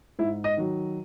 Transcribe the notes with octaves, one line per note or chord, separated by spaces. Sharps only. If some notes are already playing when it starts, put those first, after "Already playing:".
G#2 E4
D#5
D#3 F#3